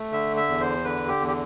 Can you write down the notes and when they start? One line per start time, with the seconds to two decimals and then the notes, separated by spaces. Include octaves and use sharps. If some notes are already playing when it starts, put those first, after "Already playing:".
Already playing: A3
0.11 D3 E5
0.37 E5
0.48 E2
0.61 C5
0.84 D3 B4
1.08 G4
1.20 E2
1.28 G4